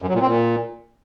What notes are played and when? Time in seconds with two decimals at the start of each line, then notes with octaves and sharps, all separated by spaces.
0.02 F#2
0.09 F#3
0.15 A#2
0.21 C4
0.28 A#2